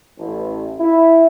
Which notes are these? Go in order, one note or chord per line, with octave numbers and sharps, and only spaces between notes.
A1
E4